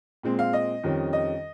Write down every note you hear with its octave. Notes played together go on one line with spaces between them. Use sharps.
A#2 G#3 C4
F5
D#5
F2 D#3 G3 C#4
D#5